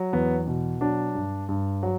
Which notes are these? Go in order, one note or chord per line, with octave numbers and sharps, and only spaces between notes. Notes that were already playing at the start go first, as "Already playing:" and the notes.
Already playing: F#3
E2 B3
B2
F#3 D4
G2
G2
F#3